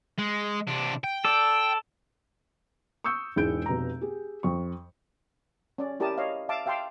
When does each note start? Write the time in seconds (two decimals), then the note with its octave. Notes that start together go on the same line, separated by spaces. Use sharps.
0.18 G#3
0.67 C3 D4
1.04 G5
1.25 A4 D5
3.04 C#6 D#6 E6 G6 C#7
3.36 E1 G#2 E4 G#4 G6 D7
3.66 F1 B2 B4 A#5
4.01 G4 G#4
4.43 F2 C#6
5.78 C#4 D5
6.00 E4 G4 A#4 D5 A5 D#6
6.18 C#5 D#5 F5
6.49 E5 F5 A5 D6
6.66 E5 F5 G5 A5 C6 D6